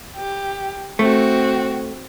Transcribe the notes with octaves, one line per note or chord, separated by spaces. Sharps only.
G4
A3 C4 F#4